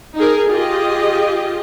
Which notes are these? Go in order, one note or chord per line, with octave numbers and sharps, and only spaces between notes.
D#4 G#4 A#4
F4 G4 G#4 D#5